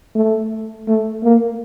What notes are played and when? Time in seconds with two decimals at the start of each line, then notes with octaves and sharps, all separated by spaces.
0.15 A3
0.88 A3
1.24 A#3